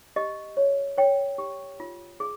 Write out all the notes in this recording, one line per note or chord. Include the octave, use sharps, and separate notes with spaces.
G4 D#5
C#5
C#5 G5
G4
F4
G#4